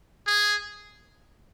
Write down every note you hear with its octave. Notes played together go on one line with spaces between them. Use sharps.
G#4